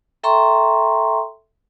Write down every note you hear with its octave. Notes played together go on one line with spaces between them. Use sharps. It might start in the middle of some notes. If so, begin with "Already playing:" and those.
A4 E5 G5 A#5 C6 C#6